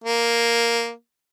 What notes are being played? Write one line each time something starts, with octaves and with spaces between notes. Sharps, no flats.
A#3